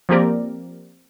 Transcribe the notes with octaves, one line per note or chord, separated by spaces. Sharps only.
F3 A#3 C4 G4 A#4 D5